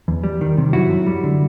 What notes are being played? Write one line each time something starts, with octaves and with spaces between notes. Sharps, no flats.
E2
G3
D#3
C3
F#2 E4 F#4
F#2
G3
D3